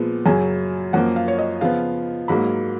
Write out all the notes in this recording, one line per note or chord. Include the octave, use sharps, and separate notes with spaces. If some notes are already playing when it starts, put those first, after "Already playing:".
Already playing: A#2 F3 G#3 B3
F#2 C#3 F#3 G#5
F#2 F3 A#3 F#5
F5
C#5
D#5
C#3 F3 B3 F5
G#2 F#3 A#3 B5